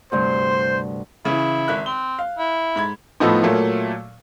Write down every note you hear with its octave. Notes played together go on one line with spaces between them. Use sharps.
D2 G2 C3 C5
C#3 E3 E4
G#1 E5 F#6
C4 G7
F5
E4
G#2 B5 G#6
A2 F3 A3 B3 D#4
A#2 F#3 A3 A#3